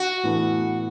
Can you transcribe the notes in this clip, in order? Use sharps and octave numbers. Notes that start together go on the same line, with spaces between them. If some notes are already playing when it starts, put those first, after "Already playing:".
Already playing: F#4
A2 E3 B3 D4 A4